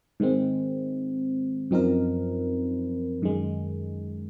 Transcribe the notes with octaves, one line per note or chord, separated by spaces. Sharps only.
G#2 D#3 G#3 C4
F#2 F3 C4 D#4 A#4
F#2 D#3 G#3